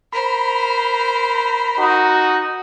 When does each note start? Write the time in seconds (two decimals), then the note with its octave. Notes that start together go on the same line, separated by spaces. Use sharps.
0.13 A#4 C5 B5
1.78 D#4 F#4